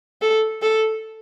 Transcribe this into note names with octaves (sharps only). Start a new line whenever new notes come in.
A4
A4